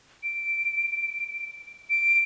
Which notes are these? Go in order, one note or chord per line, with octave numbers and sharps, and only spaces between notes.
D7
D7